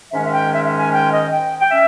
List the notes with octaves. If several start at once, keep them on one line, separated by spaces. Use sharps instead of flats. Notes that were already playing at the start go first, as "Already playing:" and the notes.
G#2 D#3 G#3 C#4 E5
E5
G5
E5
E5
G#5
G5
D#5
G5
G5
C#4 E5